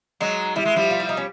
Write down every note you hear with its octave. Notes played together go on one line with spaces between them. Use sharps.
F#3 G#3 D#4
G3 E4
G#3
F3 G3
F4
E4
D#4
C#4